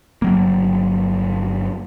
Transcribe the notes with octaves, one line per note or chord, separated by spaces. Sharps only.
G1 F#3 A#3